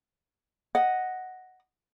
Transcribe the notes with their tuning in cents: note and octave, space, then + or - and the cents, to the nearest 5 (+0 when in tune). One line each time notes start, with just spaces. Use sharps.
D#5 +0 F#5 +0